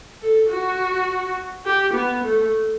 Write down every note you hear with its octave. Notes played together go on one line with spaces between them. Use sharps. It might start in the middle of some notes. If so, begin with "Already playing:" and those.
A4
F#4
G4
B3
A3